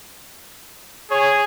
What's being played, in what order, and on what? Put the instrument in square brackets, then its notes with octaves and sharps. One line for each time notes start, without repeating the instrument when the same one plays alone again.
[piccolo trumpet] G#4 [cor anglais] C#5